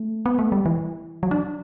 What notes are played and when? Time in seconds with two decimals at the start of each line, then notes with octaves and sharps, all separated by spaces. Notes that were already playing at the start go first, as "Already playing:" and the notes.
Already playing: A3
0.26 B3
0.39 A3
0.52 G3
0.66 E3
1.23 F#3
1.31 D4